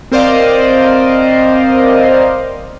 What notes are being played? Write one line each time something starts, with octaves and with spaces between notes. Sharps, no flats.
C4 A#4 C5 D5 D#5 F5